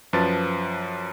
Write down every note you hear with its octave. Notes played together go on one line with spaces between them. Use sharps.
F#2 F3 B4 A5 A6